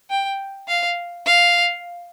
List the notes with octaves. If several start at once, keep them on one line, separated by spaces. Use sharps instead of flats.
G5
F5
F5